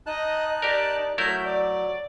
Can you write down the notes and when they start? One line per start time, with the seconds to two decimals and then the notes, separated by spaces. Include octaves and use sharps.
0.06 D#4 D#5 A5 F#6
0.62 G4 A#4 D5
1.18 F#3 A3 E4 A#4 G6
1.44 D5